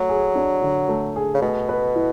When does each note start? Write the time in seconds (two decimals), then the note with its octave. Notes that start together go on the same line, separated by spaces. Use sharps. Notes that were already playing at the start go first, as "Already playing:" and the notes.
Already playing: F#3 A3
0.09 G#4
0.36 D4
0.62 D3
0.89 A3
1.16 G#4
1.34 C#3
1.42 B2 A3
1.69 B4
1.95 E4